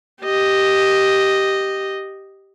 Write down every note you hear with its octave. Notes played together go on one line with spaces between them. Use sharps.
G4 D#5